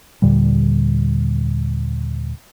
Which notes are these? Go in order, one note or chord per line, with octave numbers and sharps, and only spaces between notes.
D#2 A#2 D3 G3